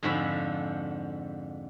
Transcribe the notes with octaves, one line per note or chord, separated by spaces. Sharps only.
F2 G#2 D3 F3 F#4 B5